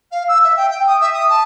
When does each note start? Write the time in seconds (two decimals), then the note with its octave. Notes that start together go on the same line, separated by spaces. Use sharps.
0.11 F5
0.28 E6
0.43 E5
0.56 G5
0.70 G5
0.86 D#6
1.00 E5
1.13 D#6
1.29 A5